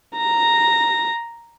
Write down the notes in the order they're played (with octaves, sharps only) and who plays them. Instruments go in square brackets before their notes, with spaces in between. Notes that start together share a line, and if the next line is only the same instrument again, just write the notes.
[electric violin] A#5 A#6